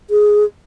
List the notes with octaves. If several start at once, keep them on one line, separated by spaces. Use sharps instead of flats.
G#4